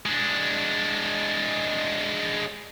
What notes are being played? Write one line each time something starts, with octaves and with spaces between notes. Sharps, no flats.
G#3 D4